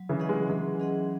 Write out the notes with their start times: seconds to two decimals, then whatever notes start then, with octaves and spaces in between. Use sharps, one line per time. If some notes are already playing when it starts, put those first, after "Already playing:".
Already playing: F#3
0.09 C#3 E3
0.20 C#4 G#4 D#5 F#5
0.29 E3 G#3
0.49 E3 F#3 G#3
0.80 C#4 G#4 D#5 F#5